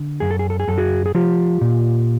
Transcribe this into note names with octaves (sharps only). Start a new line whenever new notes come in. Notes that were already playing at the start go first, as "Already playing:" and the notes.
Already playing: D3
F#2 G#4
A4
G#4
A4
G#4
F#2 A4
F#4 G#4
G#4
F3 F4 G4
A#2